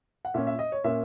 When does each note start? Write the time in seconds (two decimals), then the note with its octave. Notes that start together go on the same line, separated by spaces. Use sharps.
0.25 F#5
0.34 A#2 A#3 C#4 E5
0.47 E5
0.59 D#5
0.72 C#5
0.84 A#2 A#3 C#4 E5